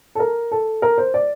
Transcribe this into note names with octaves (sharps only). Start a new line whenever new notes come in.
A4
A#4
A4
A#4
C5
D5